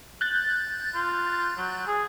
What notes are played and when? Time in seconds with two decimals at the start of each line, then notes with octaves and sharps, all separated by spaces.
0.21 F#6 G6 A6
0.94 F4
1.57 F#3
1.87 G#4